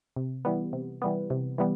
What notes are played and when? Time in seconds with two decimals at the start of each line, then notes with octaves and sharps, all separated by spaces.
0.16 C3
0.45 E3 G3 B3
0.73 C3
1.02 E3 G3 B3
1.30 C3
1.58 E3 G3 B3